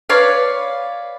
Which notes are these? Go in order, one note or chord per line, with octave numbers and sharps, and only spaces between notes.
B4 C#5 D5 F5